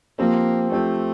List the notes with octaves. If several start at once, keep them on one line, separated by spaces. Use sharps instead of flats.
F3 A#3 C4 G4 C5
F3 A3 C4 G4 C5